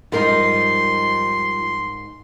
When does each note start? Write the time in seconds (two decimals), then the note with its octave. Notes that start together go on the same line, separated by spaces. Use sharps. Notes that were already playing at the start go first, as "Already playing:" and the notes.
0.12 G#2 F3 G3 D#4 A#4 C6